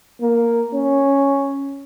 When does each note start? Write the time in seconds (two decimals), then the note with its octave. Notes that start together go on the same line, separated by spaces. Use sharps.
0.21 A#3
0.74 C#4